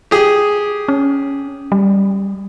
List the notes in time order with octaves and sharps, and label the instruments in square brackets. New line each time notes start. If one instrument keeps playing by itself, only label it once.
[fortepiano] G4 G#4
[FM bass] C#4
G3